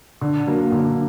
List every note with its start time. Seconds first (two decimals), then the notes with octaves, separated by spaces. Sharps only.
0.21 D3
0.47 F#3 A#3
0.72 D3